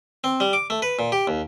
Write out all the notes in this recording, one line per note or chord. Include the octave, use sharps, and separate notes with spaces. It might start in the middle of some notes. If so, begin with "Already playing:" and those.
C4
G3
D6
A3
B4
A#2
G4
D#2